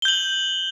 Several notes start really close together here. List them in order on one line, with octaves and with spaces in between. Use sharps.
G7 G6 F#7